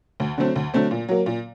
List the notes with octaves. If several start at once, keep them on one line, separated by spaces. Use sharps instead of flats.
D2
D3 F#3 A3 C4
D2
D3 F#3 A3 C4
A#2
F#3 A#3
A#2